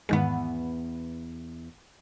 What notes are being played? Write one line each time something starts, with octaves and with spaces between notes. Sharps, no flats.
E2 G#2 D#3 G#3 B3